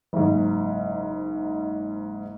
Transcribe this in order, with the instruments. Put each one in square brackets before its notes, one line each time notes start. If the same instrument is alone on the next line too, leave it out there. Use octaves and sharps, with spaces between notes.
[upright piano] F#1 G#2